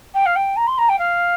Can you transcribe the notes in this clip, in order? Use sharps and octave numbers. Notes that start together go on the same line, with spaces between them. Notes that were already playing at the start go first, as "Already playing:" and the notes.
G5
F5
G5
A#5
C6
A#5
G5
F5